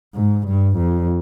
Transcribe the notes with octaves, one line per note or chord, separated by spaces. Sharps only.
G#2
G2
F2